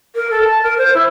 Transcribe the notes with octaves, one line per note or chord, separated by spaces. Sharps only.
A#4
A4
A5
A#4
C5
E4